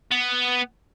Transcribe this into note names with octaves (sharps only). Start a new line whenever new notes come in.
B3